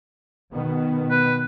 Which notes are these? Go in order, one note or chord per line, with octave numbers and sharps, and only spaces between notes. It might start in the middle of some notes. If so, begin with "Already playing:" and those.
B2 D#3 B3
B4